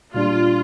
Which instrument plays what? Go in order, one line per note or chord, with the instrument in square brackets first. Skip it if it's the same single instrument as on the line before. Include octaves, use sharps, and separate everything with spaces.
[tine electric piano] A#2 G3 D4 [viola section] F4